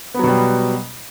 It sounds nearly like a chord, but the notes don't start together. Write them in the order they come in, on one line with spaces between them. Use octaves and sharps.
B3 F#3 B2 G3